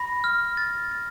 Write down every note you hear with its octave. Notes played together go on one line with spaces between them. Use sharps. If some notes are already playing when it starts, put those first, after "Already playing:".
Already playing: B5 A#6
F6
A6
A6